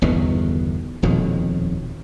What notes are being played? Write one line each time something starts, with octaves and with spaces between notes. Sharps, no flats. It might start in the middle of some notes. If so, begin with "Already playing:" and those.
G1 E2 B2 D#3
D#1 F2 B2 D#3